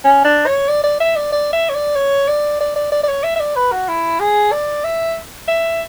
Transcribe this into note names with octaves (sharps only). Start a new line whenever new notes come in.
C#4
D4
C#5
D5
D5
E5
D5
D5
E5
C#5
D5
C#5
D5
D5
D5
D5
D5
C#5
E5
E5
D5
B4
F#4
E4
G#4
D5
E5
E5